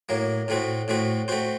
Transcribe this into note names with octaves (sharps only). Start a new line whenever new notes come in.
A2 F#3 A#3
A2 A3 C4 F#4
A2 A3 C4 F#4
A3 C4 F#4 C5